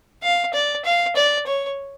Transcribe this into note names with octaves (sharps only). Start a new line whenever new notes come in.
F5
D5
F5
D5
C#5